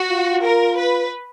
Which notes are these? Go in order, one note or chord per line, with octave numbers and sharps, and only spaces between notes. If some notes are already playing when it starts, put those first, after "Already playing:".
Already playing: F#4
F4
A#4
B4